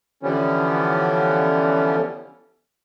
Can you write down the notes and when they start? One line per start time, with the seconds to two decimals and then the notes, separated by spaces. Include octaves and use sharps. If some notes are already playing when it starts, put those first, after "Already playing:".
0.23 D3 E3 F3 G3 B3 C#4